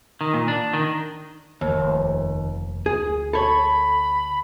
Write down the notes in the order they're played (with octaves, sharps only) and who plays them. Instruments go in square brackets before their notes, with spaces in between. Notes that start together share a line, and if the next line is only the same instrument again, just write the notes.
[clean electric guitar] D#3
A#2
D4
D#3
[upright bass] F1 C3 [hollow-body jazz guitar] D#2
[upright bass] D2 [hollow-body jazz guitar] G#4
[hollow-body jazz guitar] A4 C#5 [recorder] B5